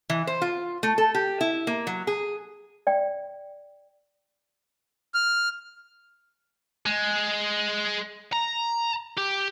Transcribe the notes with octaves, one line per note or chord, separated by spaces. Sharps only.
E3
C5
F4
A3
A4
G4
E4
A#3
F#3
G#4
D5 G5
F6
G#3
A#5
G4